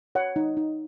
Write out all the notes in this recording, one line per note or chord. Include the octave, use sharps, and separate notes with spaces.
C#5 F#5
D#4
D#4